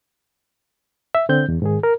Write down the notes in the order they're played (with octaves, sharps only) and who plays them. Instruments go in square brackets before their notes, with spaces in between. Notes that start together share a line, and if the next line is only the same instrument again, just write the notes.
[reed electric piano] E5
D3 C4 G6
E2
G#2 D#3 G#4
A#4